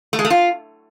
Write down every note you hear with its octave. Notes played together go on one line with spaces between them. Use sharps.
A3
G#3
A3
F4